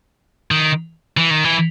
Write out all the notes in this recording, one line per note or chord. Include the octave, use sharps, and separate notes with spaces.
D#3
E3
D#3
E3